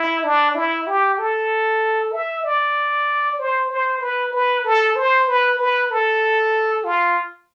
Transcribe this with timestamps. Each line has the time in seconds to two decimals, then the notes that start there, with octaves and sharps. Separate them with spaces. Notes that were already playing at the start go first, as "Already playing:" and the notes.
Already playing: E4
0.24 D4
0.55 E4
0.87 G4
1.19 A4
2.12 E5
2.44 D5
3.39 C5
3.70 C5
4.01 B4
4.32 B4
4.64 A4
4.96 C5
5.28 B4
5.59 B4
5.91 A4
6.84 F4